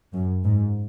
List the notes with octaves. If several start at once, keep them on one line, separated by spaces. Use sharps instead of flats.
F#2
G#2